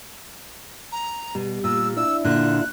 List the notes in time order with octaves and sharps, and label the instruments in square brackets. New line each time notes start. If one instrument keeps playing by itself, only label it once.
[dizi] A#5
[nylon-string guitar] B2 [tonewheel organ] G3
[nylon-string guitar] A#2 [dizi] E6
[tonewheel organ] D4 E4 [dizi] E6
[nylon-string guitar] A#2 D3 [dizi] F#6